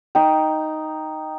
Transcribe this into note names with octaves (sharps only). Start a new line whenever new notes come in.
D#4 G5